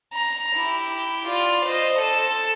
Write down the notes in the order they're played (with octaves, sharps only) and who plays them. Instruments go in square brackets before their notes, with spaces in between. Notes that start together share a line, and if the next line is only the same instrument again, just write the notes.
[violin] A#5
E4 G4
F4 D5
C5 D#5
A4 E7